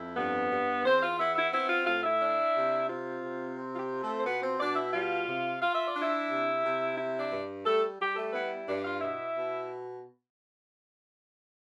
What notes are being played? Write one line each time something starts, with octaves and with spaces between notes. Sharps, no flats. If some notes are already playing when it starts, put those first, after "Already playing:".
Already playing: F2 E4
G2 B3 B4
G2
E2 C4 C5
F4 F5
B3 E4 E5
E4 E5
C4 E4 E5
F4 F5
A2 F4 F5
E4 E5
D4
C3
C4 F4
C3
C4
F4
G4
F4
A3 A4
C5
B2 B3 B4
C4 C5
B2 D4 D5
E4 E5
G3 F4 F5
C3
F4 F5
E5
D5
D4
E4 E5
C3
C3
E4
D4 D5
G2
G3 A3 A4
G3 G4
A3 A4
B3 E4 B4
G2 D4 D5
F4 F5
B2 E4 E5
B2